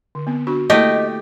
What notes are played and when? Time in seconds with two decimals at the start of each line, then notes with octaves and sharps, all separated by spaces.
0.15 D3
0.27 B3 C4
0.47 D4 F#4 C#6
0.70 A3 A#3 E4 G4 A#4 D#5